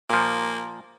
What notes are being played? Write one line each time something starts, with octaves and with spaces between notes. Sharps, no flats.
A#2 F3 A#3